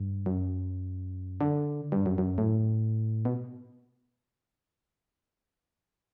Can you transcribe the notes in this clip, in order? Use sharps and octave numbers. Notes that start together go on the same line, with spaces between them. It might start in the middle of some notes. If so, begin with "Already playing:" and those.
Already playing: G2
F#2
D3
G2
F#2
F#2
A2
B2